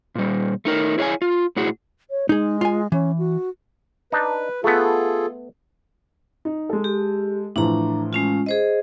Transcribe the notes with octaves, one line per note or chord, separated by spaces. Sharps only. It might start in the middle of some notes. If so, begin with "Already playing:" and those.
A#2 G3
A3 D#4 A#4
E4 G#4 C#5 D5 F5 G#5
F4
A2 E4 F#4 G#4
C#5
G#3 D#4 G#4
F4 G#5
E3 C#4
F#4
D4 D#4 B4
A3 B3 F4 G#4 A4
D#4
G#3 A4
G4
A2 E3 F3 D4 A#5
G#3 C#4 F4
G#4 C5 D#5